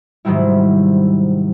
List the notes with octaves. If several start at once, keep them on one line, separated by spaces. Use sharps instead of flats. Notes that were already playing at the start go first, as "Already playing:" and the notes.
G#2 C3 D#3 F#3 G3 E4